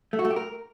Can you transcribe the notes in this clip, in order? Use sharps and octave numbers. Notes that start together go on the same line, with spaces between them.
A3
F#4
A3
G4
A#4